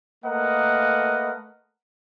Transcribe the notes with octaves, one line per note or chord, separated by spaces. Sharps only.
A3 A#3 A#4 B4 D#5 F#5